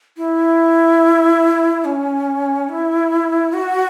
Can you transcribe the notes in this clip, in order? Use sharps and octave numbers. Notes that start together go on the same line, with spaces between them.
E4
C#4
E4
F#4